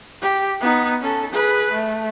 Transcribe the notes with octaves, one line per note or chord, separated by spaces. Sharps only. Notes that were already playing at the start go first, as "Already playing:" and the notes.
G4
B3 D#4
C#4 A4
G#4 B4
A3